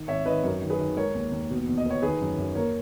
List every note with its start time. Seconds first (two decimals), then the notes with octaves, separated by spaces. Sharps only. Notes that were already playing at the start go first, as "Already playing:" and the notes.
Already playing: D#3
0.08 G#1 C#5 E5
0.26 D#3 B4 D#5
0.43 F#2 A#4 C#5
0.62 D#3
0.70 G#4 B4
0.79 D#3
0.96 G#3 A#4 C#5
1.15 D#2
1.31 D#2
1.50 B2
1.67 E2
1.78 D#5
1.86 B3 C#5
2.02 D#3 G#4 B4
2.21 F#2
2.38 F#2
2.55 A#3 A#4 C#5